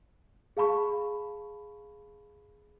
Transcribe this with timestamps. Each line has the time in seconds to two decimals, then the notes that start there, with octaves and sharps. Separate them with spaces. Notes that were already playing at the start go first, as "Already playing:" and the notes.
0.57 G#4 F5 A5 B5 C#6